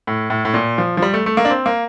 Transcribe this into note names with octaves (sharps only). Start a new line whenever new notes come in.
A2
A2
A2
A#2
F3
F3
G3
A3
A3
A#3
D4
C4
A#3